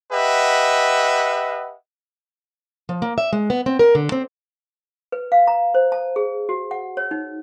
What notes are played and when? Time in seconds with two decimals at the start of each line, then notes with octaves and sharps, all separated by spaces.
0.11 G4 B4 D#5 E5 F#5
2.89 F3
3.02 A#3
3.18 E5
3.33 G#3
3.50 B3
3.66 C4
3.79 A#4
3.95 D3
4.12 C4
5.12 B4
5.32 F5
5.47 A#5
5.74 C5
5.92 A5
6.16 G#4
6.49 F#4
6.71 F#5
6.97 C#5
7.11 D#4